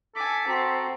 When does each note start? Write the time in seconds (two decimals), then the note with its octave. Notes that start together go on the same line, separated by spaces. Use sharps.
0.16 A4 G#5 D6 B6
0.48 C4 F#4 A#5